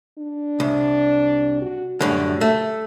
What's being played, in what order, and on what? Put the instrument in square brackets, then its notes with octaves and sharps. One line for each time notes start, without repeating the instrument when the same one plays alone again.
[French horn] D4
[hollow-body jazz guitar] C2
[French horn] F#4
[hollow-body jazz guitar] F#2 A2 D3 [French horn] G3
[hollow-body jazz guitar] A3